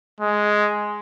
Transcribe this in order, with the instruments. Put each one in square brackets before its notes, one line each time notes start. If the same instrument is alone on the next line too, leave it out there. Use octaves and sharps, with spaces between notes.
[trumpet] G#3